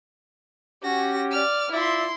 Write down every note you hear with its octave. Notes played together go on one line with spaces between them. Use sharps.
C#4 F#4 G4 A#6
D5 F6
E4 F4 D5 E5 C6